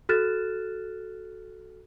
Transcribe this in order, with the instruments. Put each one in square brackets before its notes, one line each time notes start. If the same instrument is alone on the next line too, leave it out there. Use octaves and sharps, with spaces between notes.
[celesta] F#4 A4 F6 F#6 A6 E7